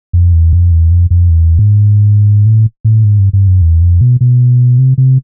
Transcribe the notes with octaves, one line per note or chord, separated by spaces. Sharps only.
F2
E2
F2
E2
F2
F2
E2
G#2
A2
A2
G#2
G2
G2
F#2
E2
F2
B2
B2
C3
C3